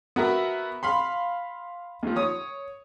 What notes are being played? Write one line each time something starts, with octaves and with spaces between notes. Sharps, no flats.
B3 F#4 A#4 E5
F5 B5 C6
D#2 F3
C#5 D#6